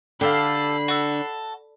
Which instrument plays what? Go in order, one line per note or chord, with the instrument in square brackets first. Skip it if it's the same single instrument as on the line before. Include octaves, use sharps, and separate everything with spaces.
[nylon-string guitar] D3 [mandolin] G4 A4 F5 [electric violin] B5 C7
[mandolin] F#4 A4